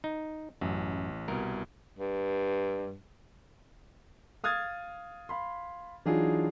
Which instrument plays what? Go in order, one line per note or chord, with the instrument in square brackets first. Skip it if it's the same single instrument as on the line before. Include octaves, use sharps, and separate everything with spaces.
[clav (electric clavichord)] D#4
[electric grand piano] A1 [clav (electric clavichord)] F#2
[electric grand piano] C2 B2 [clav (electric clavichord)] A#4
[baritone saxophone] G2
[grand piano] F5 D#6 F6 G#6 A6
F5 B5 C6
E3 F#3 D4 D#4 F4 G#4